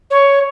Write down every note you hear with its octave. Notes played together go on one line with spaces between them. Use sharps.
C#5